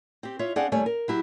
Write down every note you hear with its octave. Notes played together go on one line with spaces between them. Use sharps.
C4 G4
F4 C#5 E5
C4 D4 G#4 D5 F5 F#5
D#2 G3 A3 C#5 D5 G#5
A#4
F#3 E4 G4